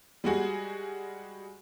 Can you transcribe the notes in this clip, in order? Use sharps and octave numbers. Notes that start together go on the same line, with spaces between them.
G3 G#3 F#4 G#4